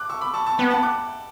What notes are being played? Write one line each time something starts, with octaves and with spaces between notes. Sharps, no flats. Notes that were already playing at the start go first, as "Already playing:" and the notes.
Already playing: D6 F#6
C#6 E6
B5 D6
A5 C#6
A5 C#6
B3 G5 B5
F#5 A5
D6 F#6